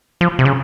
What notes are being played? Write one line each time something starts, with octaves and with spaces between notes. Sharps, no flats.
F3
C3
C#3